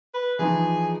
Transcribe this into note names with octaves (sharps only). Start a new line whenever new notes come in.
B4
E3 F3 D#4 G#4